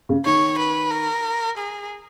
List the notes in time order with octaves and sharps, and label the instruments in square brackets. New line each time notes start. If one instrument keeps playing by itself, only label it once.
[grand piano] C#3
[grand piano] D#3 [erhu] C#5
[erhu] B4
A#4
G#4